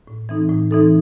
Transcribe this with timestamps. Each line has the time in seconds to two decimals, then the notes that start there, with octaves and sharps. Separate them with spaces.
0.07 A2
0.29 E3 C4 D#4 A4
0.49 A2
0.71 E3 C4 D#4 A4